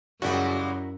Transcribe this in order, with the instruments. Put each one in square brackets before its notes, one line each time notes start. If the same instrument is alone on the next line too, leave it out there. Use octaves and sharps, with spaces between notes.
[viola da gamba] F#2 [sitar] C#3 G3 G#3 [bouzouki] E4 A#4 F#5 [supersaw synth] F#4